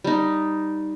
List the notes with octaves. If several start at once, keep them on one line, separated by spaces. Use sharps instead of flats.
G3 D#4